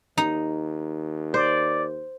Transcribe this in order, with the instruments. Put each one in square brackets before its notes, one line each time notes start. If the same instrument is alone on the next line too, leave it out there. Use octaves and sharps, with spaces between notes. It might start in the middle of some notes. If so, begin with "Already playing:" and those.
[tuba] D#2 [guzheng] D#4
[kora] C5 [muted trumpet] D5